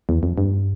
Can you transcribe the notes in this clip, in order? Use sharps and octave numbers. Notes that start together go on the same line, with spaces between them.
E2
F2
G2